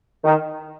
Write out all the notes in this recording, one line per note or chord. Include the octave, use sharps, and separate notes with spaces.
D#3